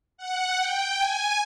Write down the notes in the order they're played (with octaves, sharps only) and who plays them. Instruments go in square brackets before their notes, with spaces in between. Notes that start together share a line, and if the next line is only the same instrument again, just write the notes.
[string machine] F#5
G5
G#5